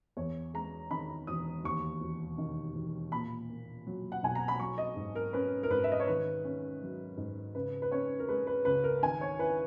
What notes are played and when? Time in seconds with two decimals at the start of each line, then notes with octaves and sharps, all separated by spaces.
0.17 E2 C#5
0.54 G#3 A#5
0.91 D#3 B5
1.27 E1 D#6
1.64 D#2 C#6
2.01 E1
2.38 D#3
2.75 E1
3.12 A#2 B5
3.49 A#3
3.87 F#3
4.12 F#5
4.23 B1 G#5
4.35 A#5
4.48 B5
4.60 F#3 C#6
4.78 D#5
4.96 G#2
5.15 A#4
5.33 C#4 B4
5.63 A#4
5.70 G#2 B4
5.84 E5
5.92 D#5
6.00 C#5
6.07 D#3 B4
6.45 C#4
6.82 F#3
7.17 G#2
7.55 C#3 B4
7.82 B4
7.92 C#4 C#5
8.20 A#4
8.28 G#3 B4
8.47 B4
8.65 C#2 B4
8.84 A#4
9.03 D#3 G#5
9.21 C#5
9.39 E4 B4